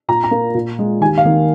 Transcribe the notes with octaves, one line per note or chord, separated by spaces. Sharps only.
A#2 A#5
A#5
A#3
A#2
G#3
D#2 G#5
F5
D#3 A#3